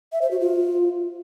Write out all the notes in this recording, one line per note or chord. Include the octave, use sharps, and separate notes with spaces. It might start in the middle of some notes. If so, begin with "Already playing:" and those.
E5
C5
F#4
F4